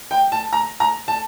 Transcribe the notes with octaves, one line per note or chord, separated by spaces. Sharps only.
G5
A5
A#5
A#5
A5